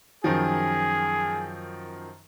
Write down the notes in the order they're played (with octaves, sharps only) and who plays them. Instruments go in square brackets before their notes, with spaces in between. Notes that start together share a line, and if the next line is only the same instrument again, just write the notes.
[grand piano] F#2 D#3 F3 [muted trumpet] G#4